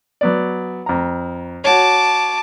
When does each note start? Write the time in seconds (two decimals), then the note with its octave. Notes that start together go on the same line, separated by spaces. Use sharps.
0.21 F#3 B3 D5
0.86 F2 A#5
1.64 F#4 C#5 A5 D6